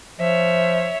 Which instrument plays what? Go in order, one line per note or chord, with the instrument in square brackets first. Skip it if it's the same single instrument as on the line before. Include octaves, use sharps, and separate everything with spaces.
[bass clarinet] F3 [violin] C#5 E5